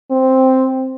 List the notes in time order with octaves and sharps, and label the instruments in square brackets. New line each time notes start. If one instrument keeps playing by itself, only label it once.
[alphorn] C4